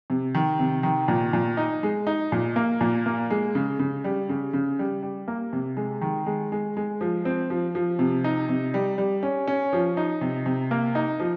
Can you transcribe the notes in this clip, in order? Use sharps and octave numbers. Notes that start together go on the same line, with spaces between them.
C3
D#3
C3
D#3
A#2
A#2
D#4
G#3
D#4
A#2
A#3
A#2
A#3
G#3
C#3
C#3
G3
C#3
C#3
G3
G3
A#3
C3
G#3
D#3
G#3
G#3
G#3
F3
C4
F3
F3
C3
D#4
C3
G3
G3
C#4
C#4
F3
D#4
C3
C3
A#3
D#4
F3